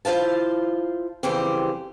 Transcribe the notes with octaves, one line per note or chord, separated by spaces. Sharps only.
E4 F4 C5 F5 A5
F2 C#3 E3 G3 G4 C5